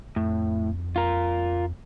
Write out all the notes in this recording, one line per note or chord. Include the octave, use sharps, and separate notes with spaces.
F2 A2
F4 A#4